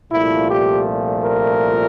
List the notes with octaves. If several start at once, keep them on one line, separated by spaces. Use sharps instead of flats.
C2 A#2 F3 A3 E4
G4
A#4